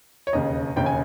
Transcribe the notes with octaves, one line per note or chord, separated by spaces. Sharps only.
C#5
E1 D#2 C#3 D#5
E1 D#2 C#3 G5
G#5